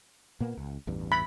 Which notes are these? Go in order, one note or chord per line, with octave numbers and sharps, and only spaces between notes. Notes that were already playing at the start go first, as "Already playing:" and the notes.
A#2 A#3 B3
C#2
A1 E2 G2
B5